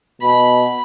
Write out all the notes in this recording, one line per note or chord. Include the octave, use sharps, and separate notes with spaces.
B2 B5